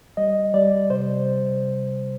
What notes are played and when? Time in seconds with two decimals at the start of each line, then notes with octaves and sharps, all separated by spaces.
0.17 G3 D#5
0.54 G3 D5
0.90 C3 C5